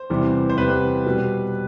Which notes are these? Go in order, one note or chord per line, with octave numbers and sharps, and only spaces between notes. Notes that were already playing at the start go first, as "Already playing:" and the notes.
Already playing: C5
E2 C3 E3 G3
C5
E2 C3 E3 G3 B4
B2 G3